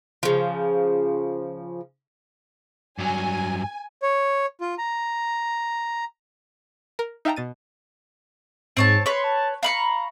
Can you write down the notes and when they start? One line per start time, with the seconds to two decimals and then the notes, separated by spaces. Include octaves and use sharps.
0.23 C#3 F3
2.98 G2 F#3 G#5
4.02 C#5
4.61 F4
4.78 A#5
6.99 A#4
7.25 D#4 E5 F5 G5 A5 A#5
7.36 B2 A6 D#7
8.77 G#2 C4 C#5 A5
9.06 B4 C#5 C6
9.24 A5
9.63 F5 A#5 B5 C#6